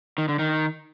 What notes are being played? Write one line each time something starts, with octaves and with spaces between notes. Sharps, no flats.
D#3
D3
D#3